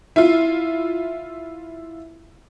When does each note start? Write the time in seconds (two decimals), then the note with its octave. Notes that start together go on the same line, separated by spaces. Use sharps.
0.16 E4 F4